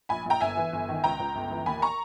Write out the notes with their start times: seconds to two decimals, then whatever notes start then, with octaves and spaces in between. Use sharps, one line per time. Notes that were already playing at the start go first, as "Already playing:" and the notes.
0.09 A#1 G#5 B5
0.26 A#1 G5 A#5
0.41 G1 E5 G#5
0.57 E3
0.72 G1
0.89 D#3
1.04 C#2 G5 A#5
1.19 C#2
1.35 G1
1.51 E3
1.66 D#2 G#5 B5
1.82 A#5 C#6